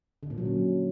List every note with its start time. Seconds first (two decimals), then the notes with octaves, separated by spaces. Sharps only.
0.23 D3
0.30 A#2
0.38 F#3
0.45 C#4